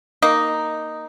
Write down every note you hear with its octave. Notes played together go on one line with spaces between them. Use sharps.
A#3 D#4